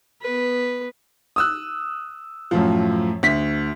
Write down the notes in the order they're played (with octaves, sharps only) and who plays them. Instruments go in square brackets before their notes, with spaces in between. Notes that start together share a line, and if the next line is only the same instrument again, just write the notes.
[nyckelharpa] B3 B4
[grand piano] D#6 E6 F#6
F#2 A2 F3
D2 B6